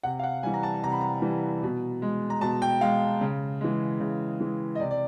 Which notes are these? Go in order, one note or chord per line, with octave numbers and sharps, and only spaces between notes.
C3 F#5
F5
F#5
E3 G3 G#5
A#5
A5
C3 A#5
B5
A#5
E3 G3
B2
G#3
A#5
B2 A5
G5
G#3 F5
C#3
E3 G#3
C#3
E3 G#3
D#5
C3 D5
D5